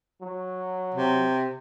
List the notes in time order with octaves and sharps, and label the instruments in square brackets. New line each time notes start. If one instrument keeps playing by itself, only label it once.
[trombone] F#3
[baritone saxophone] C3